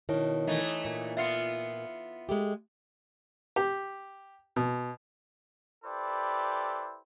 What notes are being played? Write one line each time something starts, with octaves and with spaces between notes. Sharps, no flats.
B2 D#3 E4 C#5 A5
E3 A3 D#4
A#2
B3 F4 E5 C7 C#7
G#3 A3 G4
G4
B2
E4 G4 A4 B4 C5 D5